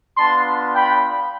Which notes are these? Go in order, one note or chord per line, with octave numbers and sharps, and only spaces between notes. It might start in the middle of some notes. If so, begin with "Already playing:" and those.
B3 D4 F4 A5 C6
G5 B5